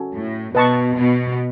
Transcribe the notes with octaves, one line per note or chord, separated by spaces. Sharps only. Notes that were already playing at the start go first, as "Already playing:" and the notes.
Already playing: C#4 F#4 A4
A2
B2 B4 D#5 A5 C#6
B2